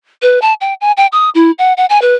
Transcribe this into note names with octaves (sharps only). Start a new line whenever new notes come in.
B4
A5
G5
G#5
G5
D#6
E4
F#5
F#5
G#5
B4